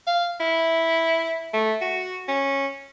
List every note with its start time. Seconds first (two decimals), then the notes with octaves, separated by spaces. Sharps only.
0.07 F5
0.40 E4
1.53 A3
1.81 F#4
2.28 C#4